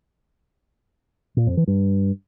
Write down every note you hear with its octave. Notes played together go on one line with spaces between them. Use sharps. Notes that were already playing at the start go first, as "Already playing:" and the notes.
A#2
F2
E3
G2